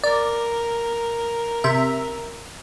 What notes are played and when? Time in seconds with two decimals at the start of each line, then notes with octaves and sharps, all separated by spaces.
0.04 A#4 D5
1.64 C3 E5